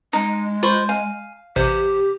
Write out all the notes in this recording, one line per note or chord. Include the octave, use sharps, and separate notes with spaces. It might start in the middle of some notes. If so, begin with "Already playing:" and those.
G#3 D#4
F4 C5 B5 C#6
F5 G#5
A1 C3 G4 C5